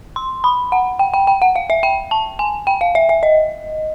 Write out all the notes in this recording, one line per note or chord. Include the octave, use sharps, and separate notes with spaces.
C6
B5
F#5
G5
G5
G5
F#5
F5
E5
G5
A5
G#5
G5
F5
E5
E5
D#5